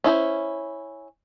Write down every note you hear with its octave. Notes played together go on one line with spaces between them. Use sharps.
C#4 E4 F4 C5